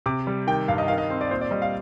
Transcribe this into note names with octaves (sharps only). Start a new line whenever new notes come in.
C3 D6
G3
D#3 G5
G2 F5
D#5
D#3 F5
D#5
C4
D5
A#2 C5
D5
G3 D#5
F5